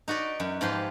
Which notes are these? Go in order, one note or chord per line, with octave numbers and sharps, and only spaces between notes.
D#4 F#4 B4 D5
F#2
G#2 F3 F4 G4 B4 C6